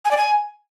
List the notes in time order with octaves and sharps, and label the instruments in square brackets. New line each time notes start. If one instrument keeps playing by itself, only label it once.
[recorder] G#5
D5
G#5